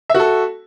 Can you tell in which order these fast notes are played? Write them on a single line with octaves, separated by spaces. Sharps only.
E5 F#4 A4